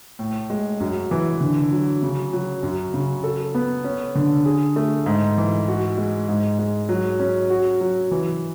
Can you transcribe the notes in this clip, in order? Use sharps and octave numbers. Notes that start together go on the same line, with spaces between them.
A2
G#3
F#2
E3
D3
F#3
C#3
F#3
F#2
C#3
A4
B3
C#4
D3
G#4
A3
G#2
E3
F#4
G#3
G#2
G#3
F#3
C#4
F#4
F#3
E3